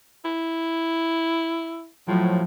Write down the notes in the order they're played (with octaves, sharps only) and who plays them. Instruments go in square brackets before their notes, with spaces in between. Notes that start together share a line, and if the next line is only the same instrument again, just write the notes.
[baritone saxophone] E4
[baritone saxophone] A2 [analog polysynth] F3 F#3